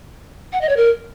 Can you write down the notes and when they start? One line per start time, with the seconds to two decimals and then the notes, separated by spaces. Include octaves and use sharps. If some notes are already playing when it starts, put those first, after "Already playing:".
0.53 F#5
0.61 D#5
0.69 C#5
0.77 A#4